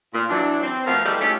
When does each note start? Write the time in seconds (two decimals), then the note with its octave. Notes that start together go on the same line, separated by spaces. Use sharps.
0.13 A#2
0.30 E3 F#3 D4
0.62 C4
0.86 B2 F3 A3 B3 A#4 F5
1.05 E3 G3 G#3 G4 A4 D5
1.21 A3 C#4 D#4 F4 G4 A4